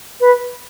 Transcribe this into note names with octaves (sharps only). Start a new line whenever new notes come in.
B4